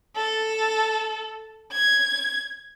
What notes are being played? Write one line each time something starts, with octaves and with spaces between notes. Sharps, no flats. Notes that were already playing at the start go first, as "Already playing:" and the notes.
A4
G#6